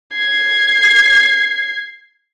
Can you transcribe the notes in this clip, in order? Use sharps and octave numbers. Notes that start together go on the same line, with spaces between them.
G#6 C7